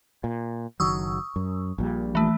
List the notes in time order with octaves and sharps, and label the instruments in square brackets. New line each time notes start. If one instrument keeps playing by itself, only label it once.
[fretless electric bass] A#2
[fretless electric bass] F#1 D#3 F#3 [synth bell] C#6 D#6 E6
[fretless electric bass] F#2
A#1 A#2 G3
[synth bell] E3 A3